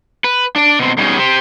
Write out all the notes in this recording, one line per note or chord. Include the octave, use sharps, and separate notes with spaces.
B4
D4 D5
B2 C4
B2 G3 G#3 C#4 D#4 G#4
G4 C5